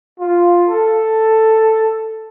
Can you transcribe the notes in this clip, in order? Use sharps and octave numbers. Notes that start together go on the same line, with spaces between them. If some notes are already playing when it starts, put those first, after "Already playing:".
F4
A4